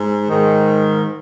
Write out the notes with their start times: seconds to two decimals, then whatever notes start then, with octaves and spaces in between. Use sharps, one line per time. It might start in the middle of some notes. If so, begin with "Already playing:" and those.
Already playing: G#2
0.28 G#2 D#3